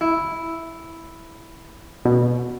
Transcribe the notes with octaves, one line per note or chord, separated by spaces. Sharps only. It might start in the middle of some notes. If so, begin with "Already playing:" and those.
E4
B2